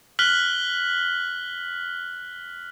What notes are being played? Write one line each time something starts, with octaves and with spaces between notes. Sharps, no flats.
F6 F#6 B6 F#7 G7